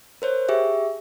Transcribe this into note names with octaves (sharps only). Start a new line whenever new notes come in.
A#4 C5 C#5
G4 G#4 E5